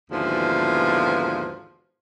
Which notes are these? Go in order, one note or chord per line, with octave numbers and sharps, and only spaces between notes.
D#2 G#2 B2 D3 E3 F3